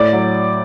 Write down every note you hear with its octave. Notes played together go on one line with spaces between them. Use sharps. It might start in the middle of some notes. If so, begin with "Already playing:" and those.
Already playing: A2 D5
F#3